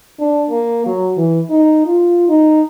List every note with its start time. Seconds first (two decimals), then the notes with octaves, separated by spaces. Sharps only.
0.20 D4
0.50 A#3
0.86 F#3
1.17 E3
1.50 D#4
1.86 F4
2.29 D#4